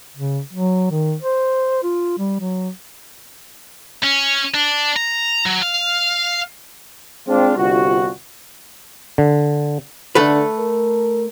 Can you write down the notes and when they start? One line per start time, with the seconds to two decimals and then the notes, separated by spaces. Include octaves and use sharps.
0.17 C#3
0.53 F#3
0.91 D#3
1.22 C5
1.83 F4
2.18 G3
2.40 F#3
4.03 C#4
4.54 D4
4.97 A#5
5.46 F#3
5.62 F5
7.27 G#3 C4 D4 F4
7.57 G1 C2 G2 F4 F#4
9.18 D3
10.15 D3 A3 A4 B4
10.59 A#4